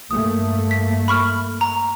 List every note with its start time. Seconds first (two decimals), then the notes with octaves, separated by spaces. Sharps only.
0.11 G2 A3 A#3 D#6
0.71 B6
1.08 B5 C#6 F6
1.61 A#5